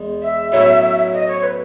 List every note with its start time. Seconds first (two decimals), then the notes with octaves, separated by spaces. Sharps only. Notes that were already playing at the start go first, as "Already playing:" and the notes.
Already playing: E2 G#3
0.22 E5
0.52 B1 A2 F#3 C#4 E4
1.12 D#5
1.28 C#5
1.43 B4